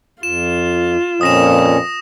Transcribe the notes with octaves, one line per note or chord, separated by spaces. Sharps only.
F2 F4 E7
F2 A#2 C#4 D#6 A#6 E7